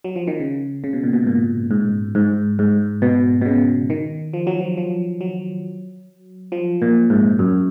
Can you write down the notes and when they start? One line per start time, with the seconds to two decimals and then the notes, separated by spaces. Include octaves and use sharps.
0.04 F#3
0.16 F3
0.27 D#3
0.40 C#3
0.84 C#3
0.93 B2
1.03 A#2
1.13 B2
1.23 G#2
1.27 A#2
1.71 G#2
2.15 G#2
2.59 G#2
3.02 B2
3.41 B2
3.45 C#3
3.90 D#3
4.33 F3
4.47 F#3
4.60 F3
4.77 F3
5.21 F#3
6.52 F3
6.82 A#2
7.10 G#2
7.39 F#2